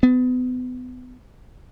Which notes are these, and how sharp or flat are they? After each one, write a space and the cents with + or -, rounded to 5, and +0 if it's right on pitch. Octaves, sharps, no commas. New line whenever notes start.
B3 +30